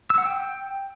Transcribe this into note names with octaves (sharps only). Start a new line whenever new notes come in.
E6
F#5
G5